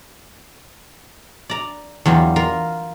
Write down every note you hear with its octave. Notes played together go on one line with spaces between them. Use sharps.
D5 A#5
E2 F#3 G3 F4
F4 A#4